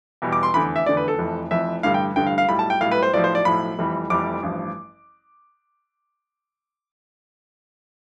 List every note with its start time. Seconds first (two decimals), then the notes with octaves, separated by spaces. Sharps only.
0.22 E2 B2 G3
0.33 D6
0.43 C6
0.54 F1 E2 D3 B5
0.76 E5
0.86 F1 E2 D3 D5
0.97 B4
1.08 A4
1.18 F1 F2 E3
1.51 F1 F2 E3 E5
1.83 A1 G2 D3 G3 F5
1.94 G5
2.16 A1 G2 D3 G3 G5
2.27 F5
2.38 F5
2.48 B1 A2 G3 B5
2.59 A5
2.70 G5
2.81 B1 A2 G3 F5
2.91 B4
3.03 C5
3.13 B1 A2 F3 D5
3.24 C5
3.35 D5
3.45 B1 A2 F3 B5
3.78 F1 F2 E3 G3
4.10 F1 F2 E3 G3 D6
4.43 A1 G2 F3